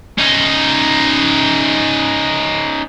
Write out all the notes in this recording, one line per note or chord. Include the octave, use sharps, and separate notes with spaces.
C#4 D#4